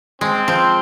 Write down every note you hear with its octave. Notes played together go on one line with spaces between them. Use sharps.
G#3 C4
F3